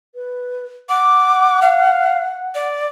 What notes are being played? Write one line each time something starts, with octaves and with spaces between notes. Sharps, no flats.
B4
F#5 D6
F5
D5